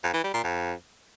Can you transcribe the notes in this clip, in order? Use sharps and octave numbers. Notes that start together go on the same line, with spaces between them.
F2
E3
G3
A#2
F2